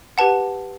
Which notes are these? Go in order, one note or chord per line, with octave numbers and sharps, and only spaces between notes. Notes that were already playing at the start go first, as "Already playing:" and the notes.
G4 B4 F#5 A5